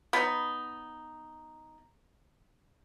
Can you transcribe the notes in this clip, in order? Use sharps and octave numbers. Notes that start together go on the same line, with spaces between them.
B3 D#4